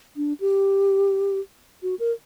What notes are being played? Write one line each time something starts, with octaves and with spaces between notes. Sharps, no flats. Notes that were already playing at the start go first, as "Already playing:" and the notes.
D4
G4
F#4
A#4